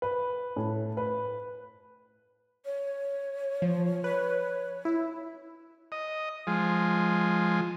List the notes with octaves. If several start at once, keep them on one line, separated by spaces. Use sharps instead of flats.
B4
A2
B4
C#5
F3
B4
E4
D#5
F3 G#3